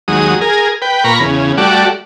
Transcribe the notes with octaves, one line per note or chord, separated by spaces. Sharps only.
D#2 F#3 G#3 D#6
G#4 A#4
B4 G5
A#2 A#5 B5 C#6
E2 C#3
G3 A3 F#4 D5